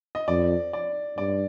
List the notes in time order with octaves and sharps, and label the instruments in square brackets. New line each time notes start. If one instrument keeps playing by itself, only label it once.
[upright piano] D#5
[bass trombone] F2 [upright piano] D5
[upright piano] D5
[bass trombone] G2 [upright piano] D5